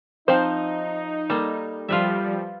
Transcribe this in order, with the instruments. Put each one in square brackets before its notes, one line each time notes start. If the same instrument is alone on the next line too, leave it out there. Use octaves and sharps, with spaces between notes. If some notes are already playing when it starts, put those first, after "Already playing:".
[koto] F3 [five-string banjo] C4 C5 [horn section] D#4
[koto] G3 [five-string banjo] A#3 A4
[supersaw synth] F3 G3 [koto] F4 B4 E5